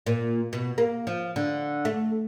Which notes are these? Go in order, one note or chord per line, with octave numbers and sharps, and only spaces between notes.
A#2
B2
A#3
F3
D3
A3